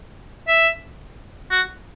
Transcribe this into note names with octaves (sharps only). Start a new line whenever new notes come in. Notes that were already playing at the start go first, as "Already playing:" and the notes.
E5
F#4